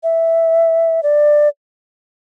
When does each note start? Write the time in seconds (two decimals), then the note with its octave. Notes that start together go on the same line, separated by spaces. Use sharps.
0.03 E5
1.03 D5